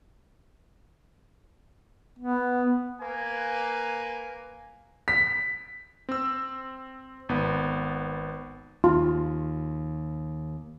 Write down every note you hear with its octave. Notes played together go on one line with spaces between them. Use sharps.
B3
A#3 B4 G#5
B6
C4 E6
G#1 B3
D#2 F4